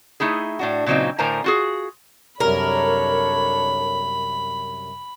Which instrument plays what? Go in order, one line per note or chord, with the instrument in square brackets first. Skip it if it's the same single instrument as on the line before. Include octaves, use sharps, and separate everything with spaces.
[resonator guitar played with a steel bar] A3 D#4 E4 G#4
A2 D4 F#4
A#2 C#3 F#3 C4 D#4
A2 D3 A#4 C5 G#5 A#5
F4 F#4 G#4
[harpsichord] C2 F#2 [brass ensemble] D4 A4 C#5 [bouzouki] A#4 [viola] B5